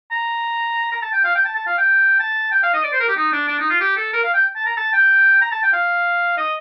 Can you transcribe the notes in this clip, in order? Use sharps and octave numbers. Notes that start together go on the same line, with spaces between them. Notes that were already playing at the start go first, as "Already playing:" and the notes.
A#5
A#5
A5
G5
F5
G5
A5
A5
F5
G5
A5
G5
F5
D#5
D5
C5
A#4
G4
D#4
D4
D4
D#4
F4
G4
A4
A#4
F5
G5
A5
A#5
A5
G5
A#5
A5
G5
F5
D#5